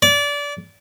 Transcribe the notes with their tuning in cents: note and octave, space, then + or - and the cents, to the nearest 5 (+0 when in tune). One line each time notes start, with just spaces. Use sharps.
D5 -25